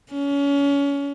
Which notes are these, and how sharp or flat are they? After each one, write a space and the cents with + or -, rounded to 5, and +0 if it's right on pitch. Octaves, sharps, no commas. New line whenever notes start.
C#4 +30